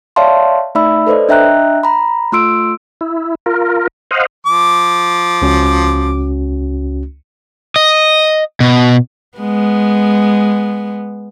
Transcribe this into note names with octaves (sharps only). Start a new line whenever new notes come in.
C#5 D5 E5 F5 A5 C6
A3 D#4 D5 E5 B5 E6
A4 B4 C5 D5 D#5
D4 D#5 E5 G5 A#5 F#6
A#5 B5
A3 F4 C6 E6 D7
E4
F4 A#4
C5 D#5 F5 F#5
F3 D6
C#2 C#4 F#4
D#5
B2
G#3 B3